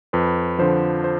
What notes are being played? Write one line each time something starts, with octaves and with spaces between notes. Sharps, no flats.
F2 B4
D3 F3 C5
C5